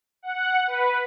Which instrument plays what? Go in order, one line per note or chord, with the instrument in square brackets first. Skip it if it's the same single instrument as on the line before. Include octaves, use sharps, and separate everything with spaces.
[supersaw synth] F#5
B4